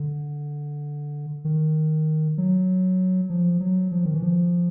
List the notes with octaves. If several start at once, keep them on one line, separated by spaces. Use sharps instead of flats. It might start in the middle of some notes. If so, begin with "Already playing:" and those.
Already playing: D3
D#3
F#3
F3
F#3
F3
D#3
E3
F3